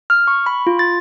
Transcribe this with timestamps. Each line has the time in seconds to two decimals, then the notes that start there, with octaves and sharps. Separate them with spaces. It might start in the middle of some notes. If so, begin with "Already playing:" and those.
0.10 F6
0.27 C#6
0.46 B5
0.67 F4
0.79 A6